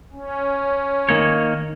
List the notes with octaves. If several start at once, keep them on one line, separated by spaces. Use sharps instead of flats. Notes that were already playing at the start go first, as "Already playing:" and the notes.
C#4
D#3 A#3 C#5